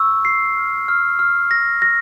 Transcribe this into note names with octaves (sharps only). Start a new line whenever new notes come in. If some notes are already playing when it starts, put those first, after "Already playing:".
Already playing: C#6 E6
C7
F6
F6
F6
A#6
A#6